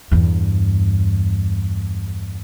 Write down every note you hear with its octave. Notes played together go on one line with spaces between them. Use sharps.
E2 G2